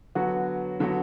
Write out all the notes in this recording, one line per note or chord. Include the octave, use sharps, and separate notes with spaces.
D3 F#3 B3 F#4
D3 F#3 B3 F#4